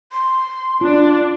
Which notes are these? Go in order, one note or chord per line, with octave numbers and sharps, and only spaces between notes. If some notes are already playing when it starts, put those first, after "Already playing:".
C6
D4 F4